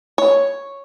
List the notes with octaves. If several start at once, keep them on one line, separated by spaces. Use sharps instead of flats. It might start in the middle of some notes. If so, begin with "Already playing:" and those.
C#5